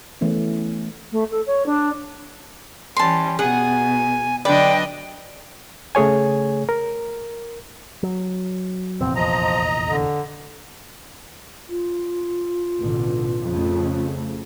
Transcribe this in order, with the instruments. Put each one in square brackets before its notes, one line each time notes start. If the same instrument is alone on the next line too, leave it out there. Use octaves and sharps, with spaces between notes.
[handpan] E3 A3 B3 C#4
[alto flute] A3
A4
C#5
D4
[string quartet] E3 G3 C#4 [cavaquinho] A5 C6
[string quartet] B2 [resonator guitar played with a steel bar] G#4 [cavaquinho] F#5 [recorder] G#5
[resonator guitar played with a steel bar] D3 D5 [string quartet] F#3 D4 D#5 [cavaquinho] B4 [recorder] G5
[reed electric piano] C#3 A3 G#4 C#5 G#5
A#4
[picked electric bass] F#3
[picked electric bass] F1 A#1 E2 [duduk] C4
[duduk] F3 [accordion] D#5 A#5
[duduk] D3
[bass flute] F4
[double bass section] A1 B2 D3
F2 C#3 A3